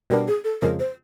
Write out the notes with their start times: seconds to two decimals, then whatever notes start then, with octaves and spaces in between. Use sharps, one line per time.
0.10 B2 G3 B3 D4 A#4
0.28 G#4
0.44 A4
0.62 F2 C#3 F3 G#3 A#4
0.79 C5